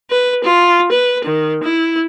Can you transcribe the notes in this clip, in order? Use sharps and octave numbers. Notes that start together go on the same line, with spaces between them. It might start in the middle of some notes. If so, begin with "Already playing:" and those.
B4
F4
B4
D#3
E4